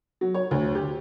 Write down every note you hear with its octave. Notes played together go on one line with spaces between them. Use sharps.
F#3
C#5
D2
G4